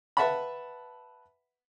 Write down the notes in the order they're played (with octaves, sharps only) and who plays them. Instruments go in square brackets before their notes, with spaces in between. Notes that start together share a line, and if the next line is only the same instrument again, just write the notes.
[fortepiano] B4 E5 F#5 A5 B5